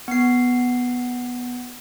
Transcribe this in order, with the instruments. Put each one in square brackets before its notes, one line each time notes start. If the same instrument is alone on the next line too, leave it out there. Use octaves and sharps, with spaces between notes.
[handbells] B3 C7